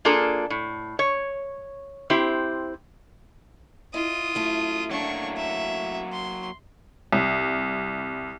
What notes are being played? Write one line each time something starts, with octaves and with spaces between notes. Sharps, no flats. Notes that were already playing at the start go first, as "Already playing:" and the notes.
A#3 D4 F4 G#4 A4
A2
C#5
C4 E4 G4 C5
E4 F4 D#5 D#6
F#2 A3 E4
F#3 A#3 D4 C#6
E5
C6
C2